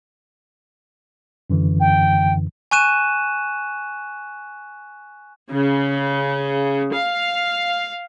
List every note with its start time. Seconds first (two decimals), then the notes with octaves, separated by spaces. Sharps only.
1.50 F#2 D3 E3
1.80 G5
2.71 G#5 C#6 F#6 D#7 E7
5.50 C#3
6.92 F5